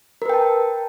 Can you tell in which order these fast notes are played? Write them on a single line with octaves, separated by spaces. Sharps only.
A#4 B4 G5 A5